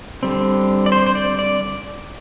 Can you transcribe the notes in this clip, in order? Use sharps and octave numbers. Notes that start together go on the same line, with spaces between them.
D3 G3 C4
D5
C5
C5
D5
D5